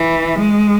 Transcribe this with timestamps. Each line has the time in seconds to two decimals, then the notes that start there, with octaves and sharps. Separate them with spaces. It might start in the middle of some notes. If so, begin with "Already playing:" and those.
Already playing: E3
0.40 G#3